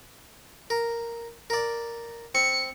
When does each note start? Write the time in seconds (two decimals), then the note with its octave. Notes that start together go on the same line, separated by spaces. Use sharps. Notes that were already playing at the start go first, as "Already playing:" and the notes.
0.70 A#4
1.50 A#4 D5
2.35 C4 C#7